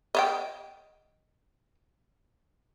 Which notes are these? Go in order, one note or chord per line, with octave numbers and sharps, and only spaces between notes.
D#5 E5 G5